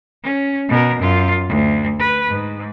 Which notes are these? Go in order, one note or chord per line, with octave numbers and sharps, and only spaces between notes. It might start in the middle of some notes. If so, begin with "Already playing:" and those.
C#4
B2 A#4
F#2 F4
D2
B4
G#2